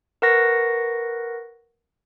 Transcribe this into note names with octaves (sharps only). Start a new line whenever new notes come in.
A#4 B4 F#5 C#6 A#6